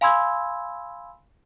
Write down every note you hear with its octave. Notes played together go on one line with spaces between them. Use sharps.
F5 G#5 B5 C6 E6 G#6